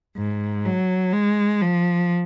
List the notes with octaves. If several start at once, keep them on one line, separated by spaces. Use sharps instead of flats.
G#2
F#3
G#3
F3